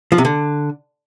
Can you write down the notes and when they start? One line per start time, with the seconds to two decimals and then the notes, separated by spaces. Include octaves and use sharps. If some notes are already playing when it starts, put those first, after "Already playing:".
0.12 F3
0.18 C3
0.25 D3